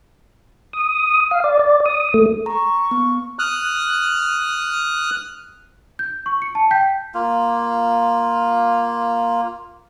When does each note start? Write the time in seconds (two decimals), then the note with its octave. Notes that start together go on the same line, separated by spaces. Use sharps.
0.73 D#6
1.31 F5
1.44 D5
1.59 D5
1.86 D#6
2.14 A3
2.46 A#5 C#6
2.91 B3
3.39 D#6 F6 F#6
5.99 G6
6.26 C#6
6.42 C#7
6.55 A5
6.71 G5 G6 B6
7.14 A#3 F4